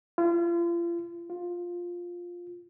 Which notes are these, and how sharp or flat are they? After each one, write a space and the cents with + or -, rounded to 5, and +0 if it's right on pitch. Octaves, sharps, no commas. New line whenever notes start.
F4 -40
F4 +5